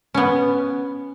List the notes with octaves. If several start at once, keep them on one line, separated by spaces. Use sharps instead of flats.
B3 C#4